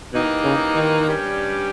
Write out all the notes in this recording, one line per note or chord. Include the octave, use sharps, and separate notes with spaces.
B2 E3 A#3 D#4 G4
C#3
D#3
G2 G3 C#4 G4